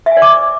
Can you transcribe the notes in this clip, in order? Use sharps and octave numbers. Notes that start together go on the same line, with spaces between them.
E5
G#5
D5
D6